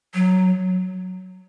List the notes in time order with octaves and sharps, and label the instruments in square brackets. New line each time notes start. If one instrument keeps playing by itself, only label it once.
[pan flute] F#3